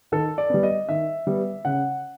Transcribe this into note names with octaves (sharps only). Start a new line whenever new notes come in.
D#3 A4
D5
G3 B3
D#5
D#3 E5
G3 B3
C#3 F#5